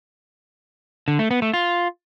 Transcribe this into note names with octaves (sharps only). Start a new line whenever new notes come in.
D3
A3
B3
A3
F4